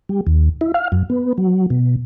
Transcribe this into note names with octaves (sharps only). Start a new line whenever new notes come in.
G3
D#2
E4
F5
F#2
B3
F#3
B2